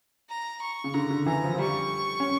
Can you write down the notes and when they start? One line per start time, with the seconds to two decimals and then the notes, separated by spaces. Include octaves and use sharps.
0.29 A#5
0.62 C#6
0.84 C#3
0.94 D3 A#5
1.11 D3
1.26 E3 A#5
1.44 F3
1.54 F3
1.59 G3 C#6
2.20 C#4